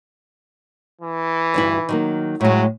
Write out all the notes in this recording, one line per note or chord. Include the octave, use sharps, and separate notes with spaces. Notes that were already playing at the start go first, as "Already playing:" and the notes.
E3
D2 G2 E4
D#3 F#3 A#3
A2 F#3 G#3